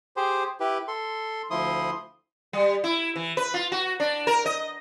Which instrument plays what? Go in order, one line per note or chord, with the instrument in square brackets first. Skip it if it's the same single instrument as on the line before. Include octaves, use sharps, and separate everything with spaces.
[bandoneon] G4 G#4 C5
E4 G4 B4
A4 C6
D2 F3 E4 C6 D#6
[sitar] G3
E4
E3
B4
F4
F#4
D4
A#4
D#5